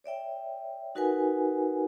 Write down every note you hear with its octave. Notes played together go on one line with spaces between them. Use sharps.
C#5 D5 E5 G5
D#4 F#4 A#4 B4 F#5 G#5